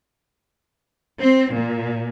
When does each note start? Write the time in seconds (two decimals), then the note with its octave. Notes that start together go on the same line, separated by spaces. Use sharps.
1.21 C4
1.54 A#2